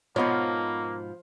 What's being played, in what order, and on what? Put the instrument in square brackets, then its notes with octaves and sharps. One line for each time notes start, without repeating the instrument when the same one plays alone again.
[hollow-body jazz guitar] G#2 B2 B3 [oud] F3 [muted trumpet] A#3 [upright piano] C#5 D#5 F#5